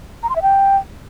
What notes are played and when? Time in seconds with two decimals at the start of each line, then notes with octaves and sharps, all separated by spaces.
0.23 A#5
0.29 C6
0.36 E5
0.42 G5